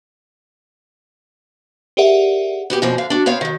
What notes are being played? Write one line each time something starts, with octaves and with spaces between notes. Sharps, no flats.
G4 G#4 A#4 D5 E5 F#5
B3 F#4 G4
F#2 B2 F3 A#3 C4
D3 F5
D4 F#4
B3 C4 C#5 F5
D#3 F#3